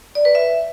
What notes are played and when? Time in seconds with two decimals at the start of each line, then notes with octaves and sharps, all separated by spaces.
0.15 D5
0.25 B4
0.35 E5